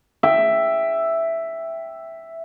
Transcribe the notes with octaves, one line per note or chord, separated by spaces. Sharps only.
E5 G5